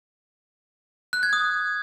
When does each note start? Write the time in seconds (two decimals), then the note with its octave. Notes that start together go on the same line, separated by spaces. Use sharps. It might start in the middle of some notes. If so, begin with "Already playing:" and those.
1.13 F#6
1.23 G#6
1.33 D#6